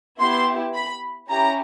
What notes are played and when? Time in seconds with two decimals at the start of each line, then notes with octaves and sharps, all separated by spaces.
0.20 B3 E4 G4 C6
0.75 B5
1.29 C#4 E4 G4 A#5